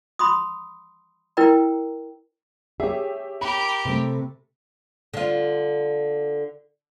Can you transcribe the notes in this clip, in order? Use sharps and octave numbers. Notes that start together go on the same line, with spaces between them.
B5 C6 D#6
E4 A#4 B4 D5 G5 A#5
G4 G#4 C#5 E5
G4 A#4 B5
C3 A3
D3 F4